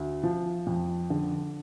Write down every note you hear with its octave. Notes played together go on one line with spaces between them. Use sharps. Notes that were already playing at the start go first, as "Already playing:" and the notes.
Already playing: D2
F3
F2
D3